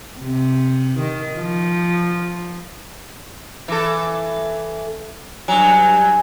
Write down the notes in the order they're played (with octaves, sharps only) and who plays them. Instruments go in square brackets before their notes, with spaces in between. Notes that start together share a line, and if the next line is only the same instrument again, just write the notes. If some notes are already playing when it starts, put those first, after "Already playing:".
[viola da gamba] C3
D#3
F3
[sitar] E3 A4
[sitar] G2 F#3 [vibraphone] G#5